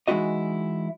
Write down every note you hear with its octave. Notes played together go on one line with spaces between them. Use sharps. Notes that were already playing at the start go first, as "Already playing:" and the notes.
E3 G#3 D#4 E4 F#4 D#5